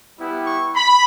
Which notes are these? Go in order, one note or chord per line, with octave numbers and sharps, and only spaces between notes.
G3 B3 E4 G4
C#6
B5